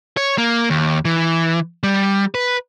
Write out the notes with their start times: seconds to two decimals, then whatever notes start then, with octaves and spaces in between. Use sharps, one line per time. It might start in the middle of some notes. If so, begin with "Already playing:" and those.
0.17 C#5
0.38 A#3
0.70 D#2
1.05 E3
1.83 G3
2.35 B4